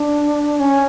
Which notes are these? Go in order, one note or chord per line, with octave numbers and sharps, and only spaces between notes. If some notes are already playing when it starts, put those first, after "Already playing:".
Already playing: D4
C#4